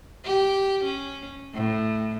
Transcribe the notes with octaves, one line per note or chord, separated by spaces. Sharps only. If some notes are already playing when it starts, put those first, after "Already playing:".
G4
C#4
A2